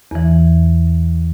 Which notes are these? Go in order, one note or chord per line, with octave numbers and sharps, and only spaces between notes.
E2 E3